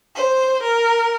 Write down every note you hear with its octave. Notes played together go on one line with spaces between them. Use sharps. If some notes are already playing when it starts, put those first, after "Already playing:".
C5
A#4